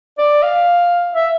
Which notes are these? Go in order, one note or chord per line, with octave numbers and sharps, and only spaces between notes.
D5
F5
E5